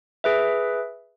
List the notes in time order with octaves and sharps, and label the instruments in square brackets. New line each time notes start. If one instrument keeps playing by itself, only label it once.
[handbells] G#4 B4 E5